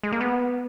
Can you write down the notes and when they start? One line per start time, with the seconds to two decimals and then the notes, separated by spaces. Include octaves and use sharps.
0.03 G#3
0.12 A#3
0.21 B3